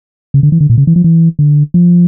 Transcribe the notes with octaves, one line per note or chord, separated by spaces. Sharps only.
C#3
D3
E3
D3
A#2
C#3
E3
F3
E3
D3
F3